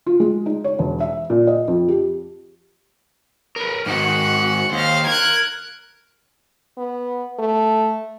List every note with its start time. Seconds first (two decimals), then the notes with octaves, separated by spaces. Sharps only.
0.06 F4
0.20 G#3
0.46 D#4
0.64 C#5
0.79 E1
1.00 E5
1.30 A#2
1.47 D#5
1.68 F2
1.88 G4
3.56 A#4 B4
3.86 G#2 D#3 F#4 F#5
4.72 D#2 C5 F5
5.07 A#4 F#6 G#6
6.78 B3
7.39 A3